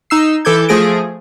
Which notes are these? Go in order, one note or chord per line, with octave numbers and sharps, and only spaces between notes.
D#4 E6 C7
E3 A4 D6 G6 G#6
F3 A3 G#4 A#6 D7